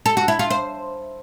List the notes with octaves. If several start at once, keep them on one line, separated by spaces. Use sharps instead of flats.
A4
F#4
E4
F4
C5